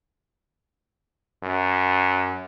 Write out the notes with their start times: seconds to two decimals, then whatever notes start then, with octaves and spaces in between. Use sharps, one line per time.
1.43 F#2